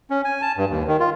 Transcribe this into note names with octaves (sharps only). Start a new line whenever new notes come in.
C#4
G#5
A5
G2
D#2
D#3
F4